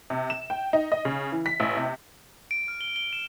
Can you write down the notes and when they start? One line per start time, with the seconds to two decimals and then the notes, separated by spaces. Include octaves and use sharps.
0.10 C3
0.30 E7
0.50 G5
0.73 D#4
0.92 D#5
1.05 C#3
1.32 E3
1.46 B6
1.60 A1
1.77 C3
2.51 D7
2.68 F6
2.81 G7
2.96 G7
3.13 E7